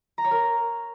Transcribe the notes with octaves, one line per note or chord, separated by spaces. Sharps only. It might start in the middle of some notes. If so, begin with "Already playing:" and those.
A#5
C#5
A#4